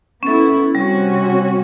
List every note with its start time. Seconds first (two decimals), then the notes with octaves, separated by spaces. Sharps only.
0.23 B3 C#4 E4 A4
0.75 C3 G3 C#4 F#4